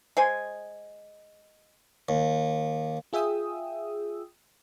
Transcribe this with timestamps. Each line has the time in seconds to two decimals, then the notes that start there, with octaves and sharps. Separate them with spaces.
0.17 G#3 C5 G#5
2.09 D#2
3.13 F4 G#4 E5 G5 D#6 E6